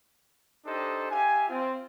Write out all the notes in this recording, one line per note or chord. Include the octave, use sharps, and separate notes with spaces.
D4 D#4 G4 A4 C5 D#5
G4 E5 F5 G#5
C4 F4